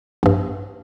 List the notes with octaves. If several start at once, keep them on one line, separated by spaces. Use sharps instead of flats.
A#1 G2